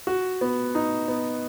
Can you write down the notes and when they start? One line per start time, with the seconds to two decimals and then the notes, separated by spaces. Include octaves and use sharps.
0.07 F#4
0.41 B3
0.75 D#4
1.08 B3